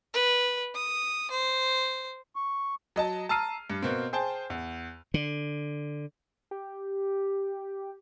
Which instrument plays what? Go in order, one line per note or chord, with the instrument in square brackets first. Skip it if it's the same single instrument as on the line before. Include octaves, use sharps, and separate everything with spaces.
[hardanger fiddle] B4
D#6
C5
[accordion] C#6
[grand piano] F#3 D#5 A5
A5 A#5 E6 F6 C7 D#7
G2
B2 A#3 C4
G#4 C5 G5 A5
E2
[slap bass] D3
[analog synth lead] G4